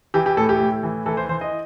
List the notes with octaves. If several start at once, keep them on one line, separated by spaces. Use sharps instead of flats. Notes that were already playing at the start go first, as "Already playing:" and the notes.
E3 G4
G4
A2 A4
G4
A2
E3
E3 A4
C5
E3 C5
D#5